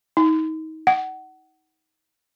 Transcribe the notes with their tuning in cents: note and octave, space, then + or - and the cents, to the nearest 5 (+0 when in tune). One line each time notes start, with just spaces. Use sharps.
D#4 +30
F#5 +25